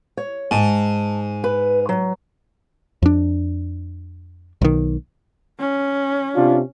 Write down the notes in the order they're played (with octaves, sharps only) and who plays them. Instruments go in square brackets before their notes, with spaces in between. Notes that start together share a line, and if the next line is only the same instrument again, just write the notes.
[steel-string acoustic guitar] C#5
[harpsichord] G#2 [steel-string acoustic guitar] A5
[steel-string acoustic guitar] B4
F#3
[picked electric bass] F2 D4
B1 D#3
[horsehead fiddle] C#4
[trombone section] C3 D4 F4